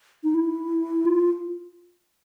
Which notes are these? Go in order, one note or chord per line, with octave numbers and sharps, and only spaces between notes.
D#4
E4
F4